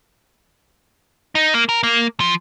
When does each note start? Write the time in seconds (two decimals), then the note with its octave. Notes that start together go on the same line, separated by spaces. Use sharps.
1.35 D#4
1.54 A#3
1.69 A#4
1.83 A#3
2.20 F3